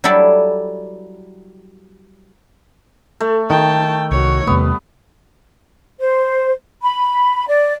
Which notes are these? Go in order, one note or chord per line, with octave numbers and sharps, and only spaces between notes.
F#3 G3 E4 A4 D5
A3
D#3 G5 A5
C2 F#4 C#5
E2 C3 G3 A3 B3
C5
B5
D5